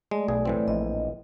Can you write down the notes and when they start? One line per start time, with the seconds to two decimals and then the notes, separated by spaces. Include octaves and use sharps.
0.11 G#3 A3 D5
0.28 B1 G#4
0.45 A2 E3 C4
0.68 A#1 D#5